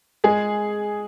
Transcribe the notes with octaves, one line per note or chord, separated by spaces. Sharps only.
G#3 G#4